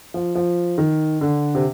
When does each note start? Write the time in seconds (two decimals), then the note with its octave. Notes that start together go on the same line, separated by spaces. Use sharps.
0.14 F3
0.35 F3
0.78 D#3
1.21 D3
1.55 C3